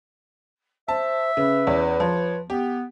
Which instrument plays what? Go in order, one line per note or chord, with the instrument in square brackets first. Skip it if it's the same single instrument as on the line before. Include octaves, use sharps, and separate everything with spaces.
[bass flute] C5 [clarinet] E5 [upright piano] A5
[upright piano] C#3 [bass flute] B4
[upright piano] E2 C#4
[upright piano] F3 [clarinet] C#5
[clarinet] B3 [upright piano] G4